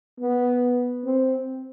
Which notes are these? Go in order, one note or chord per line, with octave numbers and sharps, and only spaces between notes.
B3
C4